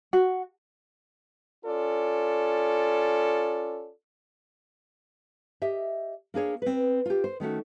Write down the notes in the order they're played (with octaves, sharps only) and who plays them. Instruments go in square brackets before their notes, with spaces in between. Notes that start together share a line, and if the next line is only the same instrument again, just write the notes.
[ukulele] F#4
[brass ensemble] C#4 F4 A4 D5
[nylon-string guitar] G4 D#5 E5
A#3 D4 G#4 C#5
C4 B4
F4 G4
C5
D#3 A3 C#4 F#4